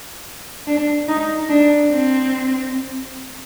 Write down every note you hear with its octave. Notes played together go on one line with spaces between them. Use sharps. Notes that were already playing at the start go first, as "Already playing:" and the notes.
D4
D#4
D4
C4